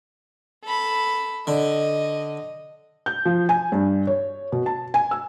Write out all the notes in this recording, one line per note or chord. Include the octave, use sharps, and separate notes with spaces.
A4 B5
D3 D#5
G6
F3
G#5
G2
C#5
B2
A5
G#5
E6